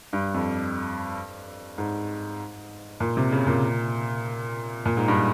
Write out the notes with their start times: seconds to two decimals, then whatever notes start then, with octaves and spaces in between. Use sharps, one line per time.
0.13 G2
0.34 F2
1.78 G#2
3.00 A#2
3.17 C3
3.32 C#3
3.47 A#2
4.86 A#2
4.97 G#2
5.08 G2